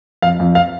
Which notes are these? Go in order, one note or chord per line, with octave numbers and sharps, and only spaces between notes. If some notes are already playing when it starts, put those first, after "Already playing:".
F2 F5
F2
F5